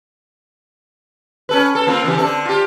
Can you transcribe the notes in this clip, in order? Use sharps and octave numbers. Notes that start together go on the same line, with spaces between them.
C#4 A4 B4
A4
A#3 C4 F4
C#3 E3 G4
D3 C4 A4
F4 G4